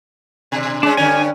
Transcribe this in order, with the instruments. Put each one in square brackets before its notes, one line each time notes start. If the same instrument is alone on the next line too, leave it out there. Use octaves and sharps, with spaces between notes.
[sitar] B2
[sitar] G#3 C#4 [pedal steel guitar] D4
[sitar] G2 D3 C#4 [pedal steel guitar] G#5